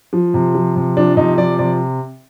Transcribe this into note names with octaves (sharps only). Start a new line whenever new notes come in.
F3
C3
F3
C3
F3 D4
C3 D#4
F3 D5
C3 D5